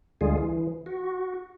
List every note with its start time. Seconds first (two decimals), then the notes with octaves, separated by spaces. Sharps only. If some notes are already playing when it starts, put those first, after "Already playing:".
0.21 D2 D3 G3 G#3 F4 G#4
0.37 E3
0.86 F#4